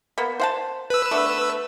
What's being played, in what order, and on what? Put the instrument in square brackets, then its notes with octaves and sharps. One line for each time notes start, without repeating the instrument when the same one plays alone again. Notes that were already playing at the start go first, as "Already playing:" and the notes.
[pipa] A#3 B3
C5 F#5 A5
[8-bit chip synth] B4 E6
[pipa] A3 B3 D4